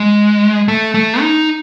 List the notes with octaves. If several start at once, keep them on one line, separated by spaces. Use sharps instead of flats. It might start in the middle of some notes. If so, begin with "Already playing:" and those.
Already playing: G#3
A3
A3
D#4